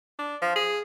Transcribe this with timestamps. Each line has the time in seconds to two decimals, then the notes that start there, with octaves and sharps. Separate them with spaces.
0.19 D4
0.42 F3
0.56 G#4